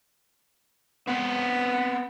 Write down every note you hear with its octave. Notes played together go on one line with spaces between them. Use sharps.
B3 C4 B4 C5